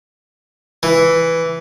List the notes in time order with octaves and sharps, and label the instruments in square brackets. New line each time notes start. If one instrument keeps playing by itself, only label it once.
[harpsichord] E3